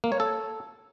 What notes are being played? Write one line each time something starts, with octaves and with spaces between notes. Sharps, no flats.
A#3
C#5
A4